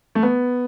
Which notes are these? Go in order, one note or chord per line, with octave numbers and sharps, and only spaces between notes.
A3
B3